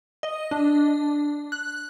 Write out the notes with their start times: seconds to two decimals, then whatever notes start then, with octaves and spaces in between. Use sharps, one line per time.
0.23 D#5
0.51 D4
1.52 F#6